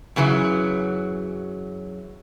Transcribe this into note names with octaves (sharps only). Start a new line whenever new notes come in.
F#2 C#3 E3 F#3